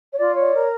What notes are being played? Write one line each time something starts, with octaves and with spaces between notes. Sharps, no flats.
C#5
F4 D5
C#5
D5
A#4